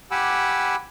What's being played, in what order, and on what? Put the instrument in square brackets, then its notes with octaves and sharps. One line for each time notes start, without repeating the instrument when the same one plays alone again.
[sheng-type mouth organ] G4 F#5 G#5 B5 D6 E6